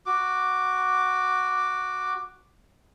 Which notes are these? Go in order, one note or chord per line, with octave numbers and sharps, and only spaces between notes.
F#4 D6